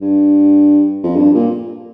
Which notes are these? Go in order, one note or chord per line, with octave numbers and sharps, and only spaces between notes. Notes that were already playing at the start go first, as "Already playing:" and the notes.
G2
F2
G2
A#2